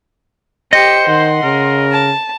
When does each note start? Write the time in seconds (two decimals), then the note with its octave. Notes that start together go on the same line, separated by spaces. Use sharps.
0.73 G4 C5 D#5 C#7
1.08 D#3 F#5 C6
1.43 C#3 A#4
1.92 A5